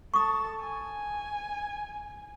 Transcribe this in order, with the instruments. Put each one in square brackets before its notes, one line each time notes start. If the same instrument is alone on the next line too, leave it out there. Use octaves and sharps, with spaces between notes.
[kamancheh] A4 A5 [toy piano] C#6 D#6
[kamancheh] G#5